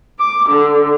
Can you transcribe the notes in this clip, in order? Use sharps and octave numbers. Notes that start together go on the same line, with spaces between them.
D6
D3